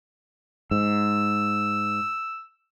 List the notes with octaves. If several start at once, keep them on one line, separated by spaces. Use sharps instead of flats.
G#2 E6